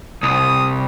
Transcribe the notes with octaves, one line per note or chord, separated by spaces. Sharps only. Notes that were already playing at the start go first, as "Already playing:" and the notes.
C2 D#6